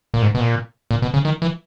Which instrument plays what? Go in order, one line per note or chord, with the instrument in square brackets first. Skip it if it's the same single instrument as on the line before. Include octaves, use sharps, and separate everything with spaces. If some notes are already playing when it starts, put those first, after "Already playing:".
[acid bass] A#2
G#2
B2
A#2
A#2
B2
C#3
D#3
E3